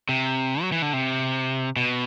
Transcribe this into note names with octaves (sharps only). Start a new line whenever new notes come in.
C3
F#3
E3
D3
C3
B2